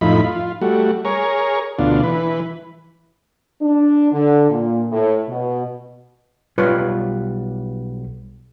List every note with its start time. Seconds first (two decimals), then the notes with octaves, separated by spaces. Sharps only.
0.01 F2 A2 F3 D#4 E4 B5
0.24 F4
0.61 G3 A3 F#4
1.05 G#4 A#4 C#5
1.79 D2 B2 D4 F4
2.03 E3 B4
3.61 D4
4.12 D3
4.50 A#2
4.91 A2
5.29 B2
6.58 B1 G3 F4 B4 C#5